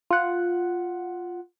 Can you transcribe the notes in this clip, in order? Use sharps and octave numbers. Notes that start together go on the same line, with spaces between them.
F4 F#5